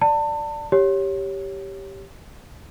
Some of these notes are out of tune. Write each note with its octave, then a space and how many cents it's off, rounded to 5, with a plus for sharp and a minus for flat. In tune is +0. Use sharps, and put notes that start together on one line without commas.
D5 +0 A5 +30
G4 +0 C#5 +0